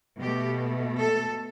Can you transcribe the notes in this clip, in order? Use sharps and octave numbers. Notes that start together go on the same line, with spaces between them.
B2 A3 G4
A4